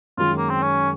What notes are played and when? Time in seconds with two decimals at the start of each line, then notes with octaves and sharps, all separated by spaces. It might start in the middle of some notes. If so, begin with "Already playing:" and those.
0.17 F#2 D#3 G#3 F4
0.38 A#3
0.50 C4
0.63 C#4